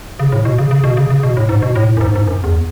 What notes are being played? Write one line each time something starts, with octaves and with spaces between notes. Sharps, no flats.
C#3
A2
B2
C#3
C#3
B2
C#3
C#3
B2
A2
G#2
B2
A2
F#2
G#2
G#2
F#2
E2